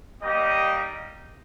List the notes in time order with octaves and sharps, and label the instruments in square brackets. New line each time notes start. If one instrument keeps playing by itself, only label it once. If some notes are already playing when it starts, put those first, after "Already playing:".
[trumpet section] G3 A#3 D#4 G4 D#5